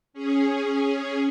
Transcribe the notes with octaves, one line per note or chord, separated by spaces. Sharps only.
C#4 G#4